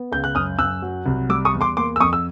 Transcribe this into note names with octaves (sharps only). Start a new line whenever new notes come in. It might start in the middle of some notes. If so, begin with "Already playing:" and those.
Already playing: B3
C#2 G6
F#6
F#2 D#6 F6
F#2 E6 F#6
F#3
C2
G3 D6 E6
C#6 D#6
E2
C6 D6
A#3 C6 D6
E6
F2 C#6 D#6
E6